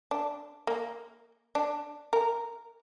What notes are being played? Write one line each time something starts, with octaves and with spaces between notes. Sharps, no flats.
D4
A#3
D4
A#4